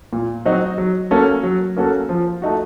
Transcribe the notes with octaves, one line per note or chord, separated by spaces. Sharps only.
A#2
F#3 C4 D#4 F#4
F#3
A#3 C#4 F#4 A4
F#3
A#3 C#4 F#4 A4
F3
A3 D#4 F#4